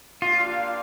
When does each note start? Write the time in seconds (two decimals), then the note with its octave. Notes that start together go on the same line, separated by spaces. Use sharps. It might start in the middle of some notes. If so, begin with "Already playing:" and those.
0.21 A#3 D4 F4 G4 D5 F5